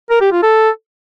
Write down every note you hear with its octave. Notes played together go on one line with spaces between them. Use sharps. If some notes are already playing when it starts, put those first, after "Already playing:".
A#4
G4
F4
A4